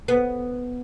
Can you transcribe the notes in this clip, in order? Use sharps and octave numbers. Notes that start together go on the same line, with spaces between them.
B3